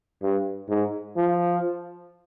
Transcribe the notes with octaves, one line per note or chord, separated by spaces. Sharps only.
G2
G#2
F3